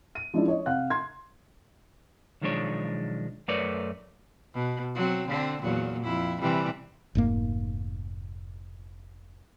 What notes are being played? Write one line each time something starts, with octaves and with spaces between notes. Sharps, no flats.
D#7
F3 G#3 C#4 D4 E4
C#5 D#5
C3 F5 F#5 F#6
C6 G#6
B1 D#3 F3 G#3 D4 C#5
F#2 A3 A#4 B4 C#5 D5
B2
F#3 C4
D3 C4
E2 A#2 F#3
F2 E4
C3 E3 G3
F1 G#2 A#3